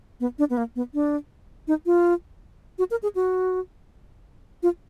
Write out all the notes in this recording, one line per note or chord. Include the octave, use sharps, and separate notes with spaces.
B3
D4
B3
A#3
B3
D4
D#4
F4
F#4
A#4
G#4
F#4
F4